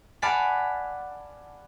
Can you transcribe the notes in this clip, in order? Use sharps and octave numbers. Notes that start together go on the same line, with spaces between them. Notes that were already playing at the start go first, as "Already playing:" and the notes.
D5 F5 F#5 G#5 A5 B5